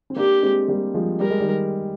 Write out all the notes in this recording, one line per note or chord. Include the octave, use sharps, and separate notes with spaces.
C4
A#3 D4 G4
G#3 C4
G3 A#3
F3 G#3
G3 A#4
G#3
D#3 G3